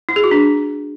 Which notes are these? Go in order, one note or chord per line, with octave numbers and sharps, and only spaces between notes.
E4
G#4
F#4
D4